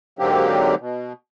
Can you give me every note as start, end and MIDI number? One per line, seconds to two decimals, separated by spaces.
0.19 0.75 44
0.19 0.75 50
0.19 0.75 54
0.19 0.75 58
0.19 0.75 60
0.19 0.75 67
0.80 1.13 47